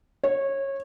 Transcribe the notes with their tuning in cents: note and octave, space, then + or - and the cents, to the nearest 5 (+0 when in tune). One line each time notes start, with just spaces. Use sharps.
C#5 -20